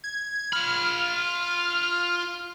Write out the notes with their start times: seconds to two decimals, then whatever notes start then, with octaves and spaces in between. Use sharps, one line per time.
0.04 G#6
0.53 F4 B5 F6